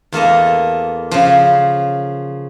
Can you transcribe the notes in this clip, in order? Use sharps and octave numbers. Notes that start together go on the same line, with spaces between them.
E2 A#3 A4 D#5
C#3 F3